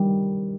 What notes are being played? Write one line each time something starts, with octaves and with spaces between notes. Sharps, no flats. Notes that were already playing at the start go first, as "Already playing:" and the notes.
Already playing: D#3 G3